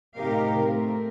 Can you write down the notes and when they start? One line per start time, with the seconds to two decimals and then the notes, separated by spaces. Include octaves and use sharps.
0.16 A2 C3 D#4 G4 A#4 F5
0.59 A3 C4 A#4